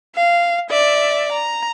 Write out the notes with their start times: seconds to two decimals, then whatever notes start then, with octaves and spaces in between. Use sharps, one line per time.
0.16 F5
0.70 D5 E5
1.32 A#5